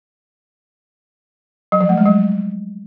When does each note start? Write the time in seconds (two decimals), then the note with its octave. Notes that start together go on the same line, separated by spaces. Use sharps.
1.72 F#3
1.81 F3
1.89 A3
1.97 G#3
2.06 F#3